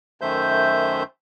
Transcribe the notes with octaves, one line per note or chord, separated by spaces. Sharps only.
F#2 D#3 A3 C5 E5 G6